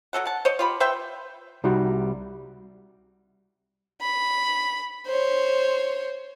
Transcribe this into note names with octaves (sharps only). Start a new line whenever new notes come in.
F#3 C#4 A4 F#5
F#5 A5
C5 C#5 D#5
F4 G4 B5
B4 C5 E5 G5
C2 G3 D#4 F#4 C6
B5
C5 C#5